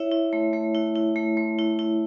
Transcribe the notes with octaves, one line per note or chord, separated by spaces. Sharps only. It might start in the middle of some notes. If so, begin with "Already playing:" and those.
Already playing: E4 C#5 E5
E4
A3
A3
E4
E4
A3
A3
E4
E4